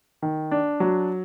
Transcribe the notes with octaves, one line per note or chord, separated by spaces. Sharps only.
D#3
D4
F#3